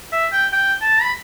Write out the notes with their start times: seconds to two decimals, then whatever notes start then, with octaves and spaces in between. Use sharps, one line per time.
0.12 E5
0.32 G5
0.53 G5
0.82 A5
1.02 B5